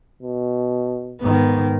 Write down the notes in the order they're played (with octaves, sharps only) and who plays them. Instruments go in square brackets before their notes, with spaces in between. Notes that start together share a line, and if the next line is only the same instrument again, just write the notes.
[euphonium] B2
[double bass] G#2 D#3 [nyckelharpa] B3